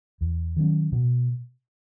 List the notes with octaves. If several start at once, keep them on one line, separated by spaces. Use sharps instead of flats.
E2
D#3 F#3 C#4
B2